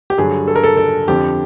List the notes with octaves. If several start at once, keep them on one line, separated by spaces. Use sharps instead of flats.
G4
G2 D3 F#3 G#4
A4
A#4
A4
A4
F2 D3 F3 G4